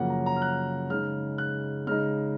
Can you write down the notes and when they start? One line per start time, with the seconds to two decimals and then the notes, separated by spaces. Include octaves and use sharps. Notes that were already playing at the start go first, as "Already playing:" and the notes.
Already playing: F#2 C#3 F3 A#3 C#4 F#5
0.10 A#5
0.26 A#5
0.36 F6
0.42 F#6
0.90 C#3 G#3 D#4 F6
1.38 F#6
1.87 C#3 G#3 D#4 F6